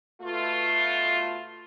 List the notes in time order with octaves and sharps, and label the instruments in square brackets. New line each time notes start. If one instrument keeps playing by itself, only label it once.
[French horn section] B2 A3 F4